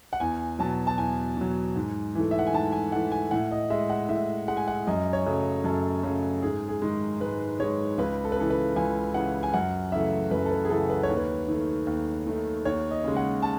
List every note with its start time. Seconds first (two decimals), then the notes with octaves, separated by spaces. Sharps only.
0.13 F#5
0.20 E2 G#5
0.59 B2 F#3 A5
0.87 A5
0.98 E2 G#5
1.37 B2 F#3
1.76 G#2
2.15 E3 A3
2.31 E5
2.39 F#5
2.47 G#5
2.53 G#2 A5
2.72 G#5
2.92 E3 A3 F#5
3.12 G#5
3.31 A2 F#5
3.51 D#5
3.70 G#3 E5
3.90 F#5
4.09 A2 E5
4.48 G#3 F#5
4.57 G#5
4.68 F#5
4.87 F#2 D#5
5.13 C#5
5.26 C#3 F#3 A3
5.64 F#2 A4
6.03 C#3 F#3 A3
6.42 G#2 G#4
6.68 G#4
6.82 D#3 G#3
7.20 G#2 B4
7.60 D#3 G#3 C#5
7.98 C#2 B4
8.25 A4
8.32 B4
8.37 C#3 E3 A4
8.50 B4
8.76 C#2 G#5
9.14 C#3 E3 F#5
9.43 G#5
9.54 F#2 F#5
9.92 C#3 E3 A3 E5
10.31 F#2 B4
10.46 A4
10.51 B4
10.65 G#4
10.70 C#3 E3 A3 A4
10.90 B4
11.03 C#5
11.09 D#2
11.17 B4
11.48 D#3 A3
11.87 D#2
12.26 D#3 A3
12.65 D#2 C#5
12.91 D#5
13.04 C#3 G#3
13.16 F#5
13.42 A5